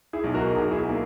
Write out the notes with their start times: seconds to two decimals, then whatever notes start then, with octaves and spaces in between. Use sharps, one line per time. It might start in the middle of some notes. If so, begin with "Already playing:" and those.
0.13 E4 G#4
0.24 B1
0.34 F#4 A#4
0.56 B1 G#4
0.64 F#4
0.71 E4 G#4
0.89 A#3